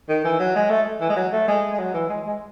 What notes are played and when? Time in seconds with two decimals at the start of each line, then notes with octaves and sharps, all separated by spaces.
0.09 D#3
0.25 E3
0.40 F#3
0.56 G#3
0.70 A3
1.01 E3
1.10 G#3
1.16 F#3
1.33 A3
1.48 G#3
1.73 G#3
1.79 F#3
1.94 E3
2.09 G#3
2.26 G#3